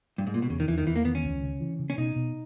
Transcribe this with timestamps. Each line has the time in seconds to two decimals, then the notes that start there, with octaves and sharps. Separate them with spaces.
0.18 G2
0.27 G#2
0.34 A#2
0.42 B2
0.49 E2 C#3
0.60 D#3
0.68 E2 E3
0.78 D#3
0.87 E2 E3
0.96 A#3
1.05 D#3 B3
1.15 C#4
1.24 C#2
1.42 C#3
1.60 E3
1.79 C#3
1.90 C#4
1.98 B2 D#4
2.16 B2